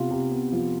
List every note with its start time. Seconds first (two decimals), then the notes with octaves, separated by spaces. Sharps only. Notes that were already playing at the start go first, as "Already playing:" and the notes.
Already playing: C3 B3 F4
0.11 C3
0.31 B3
0.52 F3